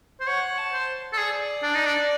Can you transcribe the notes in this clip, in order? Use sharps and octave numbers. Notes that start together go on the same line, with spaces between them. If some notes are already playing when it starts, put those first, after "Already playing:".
C5
C#5 F#5
A5
C5
A4
G#4 D5
D4
D#4
D4